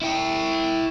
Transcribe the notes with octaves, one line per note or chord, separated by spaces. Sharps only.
E4 G5